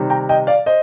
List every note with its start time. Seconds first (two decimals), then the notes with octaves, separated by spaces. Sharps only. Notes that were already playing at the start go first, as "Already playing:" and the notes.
Already playing: C3 D#3 G3
0.10 G5 A#5
0.29 D#5 G5
0.47 D5 F5
0.66 C5 D#5